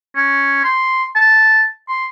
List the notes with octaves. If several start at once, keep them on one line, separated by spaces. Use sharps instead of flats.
C#4
C6
A5
C6